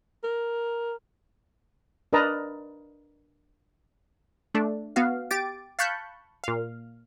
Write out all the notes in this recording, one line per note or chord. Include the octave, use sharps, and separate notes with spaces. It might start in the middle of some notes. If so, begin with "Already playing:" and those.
A#4
D4 A#4 B4 D#5 A5 A#5
A3 D4
B3 F#4 F5
G4 D6 A6 D7
F5 A5 B5 C#6 F#6 G6
A#2 F5